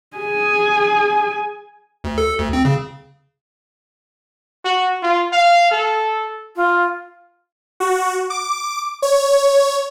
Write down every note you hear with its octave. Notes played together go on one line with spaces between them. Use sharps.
G#4 G#5
D2
A4
D2
C4
C#3
F#4
F4
F5
A4
F4
F#4
D6
C#5